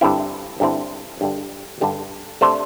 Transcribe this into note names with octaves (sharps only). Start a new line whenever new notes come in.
G2 D3 C4 E4
G2 D3 C4 E4
G2 D3 G3
G2 D3 G3
C3 A3 D4 C5